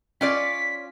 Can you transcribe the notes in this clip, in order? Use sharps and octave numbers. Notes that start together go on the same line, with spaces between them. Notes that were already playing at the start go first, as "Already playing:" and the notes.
C#4 F4 D5 B6